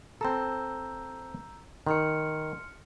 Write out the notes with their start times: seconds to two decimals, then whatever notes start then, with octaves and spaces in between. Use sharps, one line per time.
0.21 C4 A4 A#5 E6 G6
1.87 D#3 C6 F6 C#7